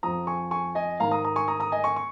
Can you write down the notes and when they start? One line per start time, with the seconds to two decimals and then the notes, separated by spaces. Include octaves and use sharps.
0.03 F2 F3 A#5 D#6
0.27 G#5 C#6
0.51 G#5 C#6
0.75 D#5 G#5
1.00 G#2 D#3 F5 A#5
1.11 A#5 D#6
1.24 A#5 D#6
1.36 G#5 C#6
1.48 A#5 D#6
1.60 A#5 D#6
1.72 D#5 G#5
1.84 G#5 C#6
1.96 C#6